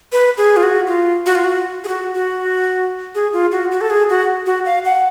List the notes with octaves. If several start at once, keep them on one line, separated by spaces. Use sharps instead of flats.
B4
G#4
F4
F#4
F4
F#4
F4
F#4
G#4
F#4
F#4
G#4
F4
F#4
F#4
A4
G#4
F#4
F#4
F5
F#5